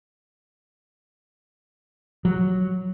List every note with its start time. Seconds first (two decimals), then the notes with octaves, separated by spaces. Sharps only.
2.25 F#3